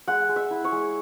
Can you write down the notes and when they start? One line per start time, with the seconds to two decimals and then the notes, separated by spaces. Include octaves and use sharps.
0.08 G#3 F#5
0.29 G#3
0.36 E5
0.51 E4
0.64 C#5
0.72 G#3